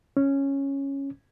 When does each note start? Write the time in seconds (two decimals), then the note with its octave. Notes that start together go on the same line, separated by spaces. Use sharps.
0.17 C#4